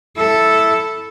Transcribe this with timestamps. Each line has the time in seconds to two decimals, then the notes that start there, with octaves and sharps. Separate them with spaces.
0.17 E4 A4